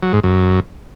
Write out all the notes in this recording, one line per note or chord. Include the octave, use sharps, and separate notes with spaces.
F#3
G#2
F#2